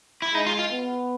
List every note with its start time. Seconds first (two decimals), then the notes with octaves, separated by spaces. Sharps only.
0.22 E4
0.34 G#3 D#4
0.46 F4
0.59 F4
0.71 B3